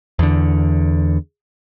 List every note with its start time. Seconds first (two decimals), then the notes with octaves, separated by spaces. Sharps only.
0.19 E2 D3